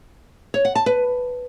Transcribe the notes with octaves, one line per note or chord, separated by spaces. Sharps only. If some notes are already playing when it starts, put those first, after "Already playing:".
C#5
F#5
A5
B4